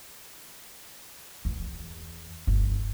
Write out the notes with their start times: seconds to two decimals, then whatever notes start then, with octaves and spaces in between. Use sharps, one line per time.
1.45 E2
2.47 G1